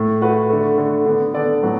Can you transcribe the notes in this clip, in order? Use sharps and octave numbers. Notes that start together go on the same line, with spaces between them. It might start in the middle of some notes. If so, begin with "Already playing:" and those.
Already playing: A2 A3
A2 A3 F#4 B4
D3 A3
D3 A3
D3 B3
D3 B3 A4 D5
A2 F#3 B3